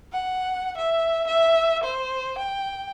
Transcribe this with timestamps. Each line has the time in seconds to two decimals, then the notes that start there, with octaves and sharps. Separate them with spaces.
0.13 F#5
0.78 E5
1.27 E5
1.84 C5
2.39 G5